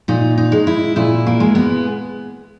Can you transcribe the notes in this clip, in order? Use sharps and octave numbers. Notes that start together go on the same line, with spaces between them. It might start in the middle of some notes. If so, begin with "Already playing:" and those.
A#2 D#4
D#4
G#3
E4
A#2 E4
A#3
G#3
B3